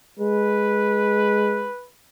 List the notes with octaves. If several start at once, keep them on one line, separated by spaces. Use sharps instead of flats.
G#3 B4